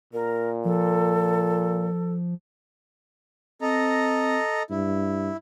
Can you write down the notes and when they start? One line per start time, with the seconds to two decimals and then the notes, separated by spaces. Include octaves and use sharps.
0.13 A#2 A#4
0.65 F3 A4
3.62 C4 A4 D#5 A#5
4.70 G2 E4